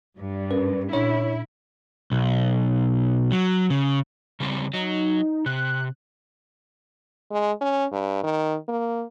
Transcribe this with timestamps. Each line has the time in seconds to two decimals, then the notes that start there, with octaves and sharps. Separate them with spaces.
0.17 G2
0.51 C#4 A#4 B4
0.93 A#2 D4 E4 C#5
2.11 B1
3.32 F#3
3.70 C#3
4.40 C#3 G3 C4
4.74 F#3 D#4
5.46 C3 F#6
7.31 G#3
7.61 C#4
7.92 G2
8.23 D#3
8.69 A#3